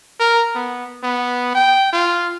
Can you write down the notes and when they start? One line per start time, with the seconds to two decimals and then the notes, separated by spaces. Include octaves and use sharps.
0.20 A#4
0.55 B3
1.03 B3
1.55 G5
1.93 F4